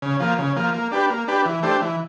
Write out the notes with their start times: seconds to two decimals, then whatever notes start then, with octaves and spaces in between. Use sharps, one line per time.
0.02 C#3
0.20 F3 A#3
0.38 C#3
0.56 F3 A#3
0.74 A#3
0.92 D4 G4 B4
1.10 A#3
1.28 D4 G4 B4
1.46 E3
1.63 A3 D4 G4 C5
1.82 E3